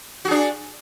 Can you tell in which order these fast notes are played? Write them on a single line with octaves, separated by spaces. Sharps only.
F#4 G#4 D4